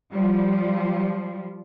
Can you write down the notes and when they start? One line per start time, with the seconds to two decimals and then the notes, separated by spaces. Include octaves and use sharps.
0.12 F3 G3